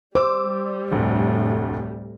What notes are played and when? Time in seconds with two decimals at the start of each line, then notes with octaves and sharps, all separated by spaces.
0.15 G3 C5 D6 E6
0.92 F1 D2 A2